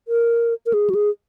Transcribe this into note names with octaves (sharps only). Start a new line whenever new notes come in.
A#4
A#4
G#4
F#4
G#4